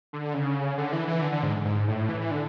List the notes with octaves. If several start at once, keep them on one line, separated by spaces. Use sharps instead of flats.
D3
C#3
D3
E3
E3
D3
D3
G#2
G#2
A2
E3
E3
D3